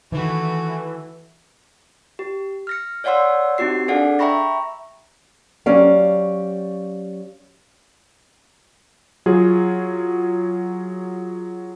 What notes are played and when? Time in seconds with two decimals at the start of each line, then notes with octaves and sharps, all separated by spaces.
0.12 D#3 E3 A3 F#4
2.19 G4
2.67 F6 A#6 C#7
3.04 C#5 D5 F5 F#5 C6 E6
3.58 C4 D#4 F#4 G4 C7
3.88 D4 G#4 A4 D5 F5 F#5
4.19 E5 G5 A#5 B5 C#6 A#6
5.66 F#3 C#4 G4 D5 F5
9.26 F#3 F4 G#4